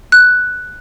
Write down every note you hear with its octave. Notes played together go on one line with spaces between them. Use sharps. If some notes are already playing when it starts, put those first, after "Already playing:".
F#6